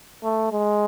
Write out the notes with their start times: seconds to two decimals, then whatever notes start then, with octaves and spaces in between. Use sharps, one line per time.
0.24 A3
0.52 G#3